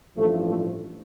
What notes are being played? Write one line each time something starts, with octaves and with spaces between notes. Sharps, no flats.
A1 G2 F3 A3
A3